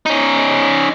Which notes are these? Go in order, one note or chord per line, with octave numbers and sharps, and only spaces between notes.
C#4 D#4